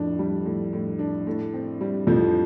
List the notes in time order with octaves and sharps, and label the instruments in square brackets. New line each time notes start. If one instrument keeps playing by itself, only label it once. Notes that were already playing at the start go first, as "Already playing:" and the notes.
Already playing: [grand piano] F2 [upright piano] A2 D4
[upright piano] G3
A2
A2
D4
A2
C4
G3
[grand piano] F2 F3 [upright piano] A2